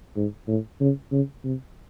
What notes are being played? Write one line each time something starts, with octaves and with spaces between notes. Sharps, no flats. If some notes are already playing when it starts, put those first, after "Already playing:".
G#2
A2
C#3
C#3
C3